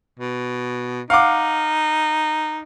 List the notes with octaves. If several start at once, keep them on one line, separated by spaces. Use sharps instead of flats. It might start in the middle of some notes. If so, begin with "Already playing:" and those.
B2
D#4 F5 F#5 D6